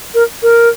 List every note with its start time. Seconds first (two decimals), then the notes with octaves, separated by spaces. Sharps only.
0.14 A#4
0.43 A#4